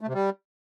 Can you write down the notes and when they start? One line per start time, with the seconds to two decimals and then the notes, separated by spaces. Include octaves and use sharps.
0.01 A3
0.08 C3
0.14 G3